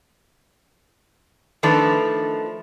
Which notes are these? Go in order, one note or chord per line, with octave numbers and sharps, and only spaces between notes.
D#3 F3 A3 D4 B4